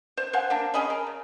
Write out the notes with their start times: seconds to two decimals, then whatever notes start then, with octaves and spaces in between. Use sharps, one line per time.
0.17 C5
0.33 C5 F5 F#5 G#5
0.50 A#3 D4
0.74 C#4 G#4 D#5 B5
0.90 A#4
1.07 C#3